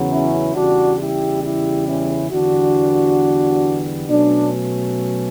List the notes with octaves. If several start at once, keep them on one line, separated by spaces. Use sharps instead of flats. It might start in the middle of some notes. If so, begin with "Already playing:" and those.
Already playing: E2 C#3 F#3 B3
C#4 E4
E2 C#3 G3 D4 F#4
E4 G4
E4 G4
C#4 E4
E2 D3 G3 B3 D4 F#4
B2 F#3 A3 C#4 D4